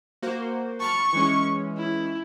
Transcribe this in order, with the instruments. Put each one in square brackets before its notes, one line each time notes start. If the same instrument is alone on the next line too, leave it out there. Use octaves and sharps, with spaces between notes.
[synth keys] A#3 F#4 C5
[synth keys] A5 B5 F6 [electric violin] C#6
[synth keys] E3 G#3 C#4
[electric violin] E4